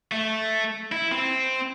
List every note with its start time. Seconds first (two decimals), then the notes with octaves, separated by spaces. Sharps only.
0.12 A3
0.92 E4
1.12 C4